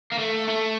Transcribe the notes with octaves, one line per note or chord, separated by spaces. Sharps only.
A#3
A3
A3